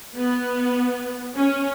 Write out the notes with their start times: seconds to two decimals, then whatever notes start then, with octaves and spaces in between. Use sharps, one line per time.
0.17 B3
1.36 C#4